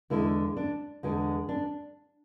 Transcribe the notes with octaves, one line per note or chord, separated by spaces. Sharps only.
E2 D3 G#3 E4
D4
E2 D3 G#3
D4